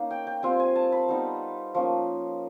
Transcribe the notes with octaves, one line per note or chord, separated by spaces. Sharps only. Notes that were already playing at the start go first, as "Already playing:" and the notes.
Already playing: A#3 C#4 D#4
G5
G5
G3 C4 F4 G#5
G#5
A5
B5
G3 B3 D#4
F3 A#3 C#4